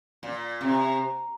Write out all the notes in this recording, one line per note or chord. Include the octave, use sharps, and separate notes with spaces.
A#2
C3